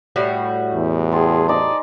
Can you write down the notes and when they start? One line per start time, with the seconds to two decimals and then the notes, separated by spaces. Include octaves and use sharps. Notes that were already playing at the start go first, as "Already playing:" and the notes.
0.16 A2 G3 F#4
0.74 E2
1.12 G#4 G5 A5 C6
1.49 D#4 G#4 D5 D#5